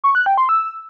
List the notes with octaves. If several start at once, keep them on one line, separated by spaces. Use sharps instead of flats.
C#6
F#6
G5
C6
E6